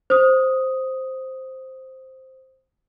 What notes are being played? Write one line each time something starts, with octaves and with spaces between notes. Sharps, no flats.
C5 D#6